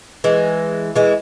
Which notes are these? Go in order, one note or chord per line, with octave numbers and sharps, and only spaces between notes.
E3 G#3
E3 G#3